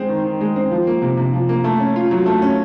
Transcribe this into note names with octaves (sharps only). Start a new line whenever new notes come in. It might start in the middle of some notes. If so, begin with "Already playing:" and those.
Already playing: G#3 C4
D#3
D#3
G#3
C4
F3
A#3
C3
C3
F3
A#3
A3
C#4
F4
F#3
A3
C#4